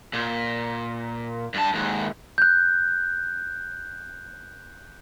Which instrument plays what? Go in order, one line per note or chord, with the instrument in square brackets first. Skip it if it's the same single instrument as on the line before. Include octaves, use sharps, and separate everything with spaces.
[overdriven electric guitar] A#2
G2 A5
D#2 G#2
[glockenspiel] F#6 G6